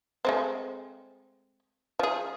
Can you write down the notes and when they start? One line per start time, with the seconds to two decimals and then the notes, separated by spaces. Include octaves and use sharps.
0.25 G#3 A3 C4
1.99 F3 G#4